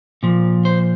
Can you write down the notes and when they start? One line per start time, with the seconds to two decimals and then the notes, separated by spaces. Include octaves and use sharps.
0.23 A#2 F3
0.65 C5